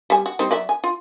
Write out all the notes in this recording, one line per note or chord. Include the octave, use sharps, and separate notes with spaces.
G3 G#5
F#4
G3 C4 D#4
F#3 D5 E5
G#5
F4